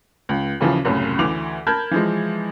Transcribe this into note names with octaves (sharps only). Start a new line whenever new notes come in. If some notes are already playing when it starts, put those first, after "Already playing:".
C#2
D#2 C#3 E3 F3
F#1 C2 F#2 A2 C#3
D2 E3 D6 F7
A#4 A5 B5 F6 G6 G#6
E3 F3 G#3